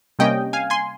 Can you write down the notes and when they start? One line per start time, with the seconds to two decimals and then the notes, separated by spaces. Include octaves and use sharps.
0.19 C3 G3 A#3 C#4 D#5 G5
0.53 F5 G#5
0.70 G#5 C6